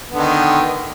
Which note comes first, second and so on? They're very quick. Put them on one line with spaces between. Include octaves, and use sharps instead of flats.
B3 D3 D#3